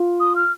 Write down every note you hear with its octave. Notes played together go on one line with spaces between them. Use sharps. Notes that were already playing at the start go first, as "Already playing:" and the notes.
Already playing: F4
D#6
F6